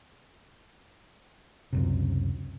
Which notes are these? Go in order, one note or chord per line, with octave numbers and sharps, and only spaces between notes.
C#2 F#2 C3